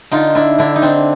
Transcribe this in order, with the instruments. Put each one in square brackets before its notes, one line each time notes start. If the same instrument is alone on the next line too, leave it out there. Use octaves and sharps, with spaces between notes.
[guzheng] D3 D#4 F4
D4 E4
D3 D4 E4
D#4
C4 D4